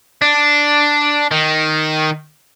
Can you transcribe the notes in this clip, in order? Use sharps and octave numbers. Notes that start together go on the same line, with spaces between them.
D4
D#3